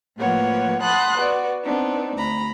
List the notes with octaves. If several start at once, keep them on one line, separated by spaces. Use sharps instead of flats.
A2 F3 A#3 B3 C#5 F#5
F#5 A5 B5 C6 D#6 F#6
B3 F#4 D5
B3 C4 D4 D#4
D2 A#5 B5